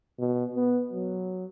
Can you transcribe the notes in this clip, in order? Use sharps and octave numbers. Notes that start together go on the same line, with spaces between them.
B2
B3
F#3